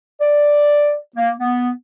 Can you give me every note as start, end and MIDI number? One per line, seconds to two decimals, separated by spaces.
0.21 0.96 74
1.16 1.32 58
1.40 1.70 59